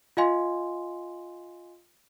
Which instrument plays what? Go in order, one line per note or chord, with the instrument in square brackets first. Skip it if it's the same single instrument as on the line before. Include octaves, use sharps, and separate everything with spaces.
[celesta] F4 D#5 F5 G#5 C6